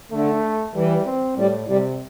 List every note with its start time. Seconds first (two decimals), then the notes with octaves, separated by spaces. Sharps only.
0.12 D3 A3
0.75 E3 G3
1.06 C4
1.37 A2 G3
1.68 C3 G3